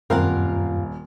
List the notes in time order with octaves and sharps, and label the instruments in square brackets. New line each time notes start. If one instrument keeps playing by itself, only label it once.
[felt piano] D#1 [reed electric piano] F#2 [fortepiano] C4 A#4 [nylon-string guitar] F4 F5 F#5